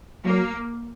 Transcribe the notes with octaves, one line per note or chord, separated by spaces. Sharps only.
F#3 A#3